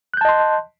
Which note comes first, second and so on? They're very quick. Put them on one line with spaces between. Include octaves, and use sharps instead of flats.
F#6 G6 A5 D#5 C6